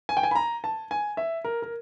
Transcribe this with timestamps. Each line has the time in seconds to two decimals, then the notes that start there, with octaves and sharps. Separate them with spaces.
0.09 G#5
0.17 G5
0.23 G#5
0.31 B5
0.35 A#5
0.64 A5
0.91 G#5
1.17 E5
1.44 A#4
1.62 A#4